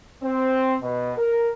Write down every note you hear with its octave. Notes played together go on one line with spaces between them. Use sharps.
C4
B2
A#4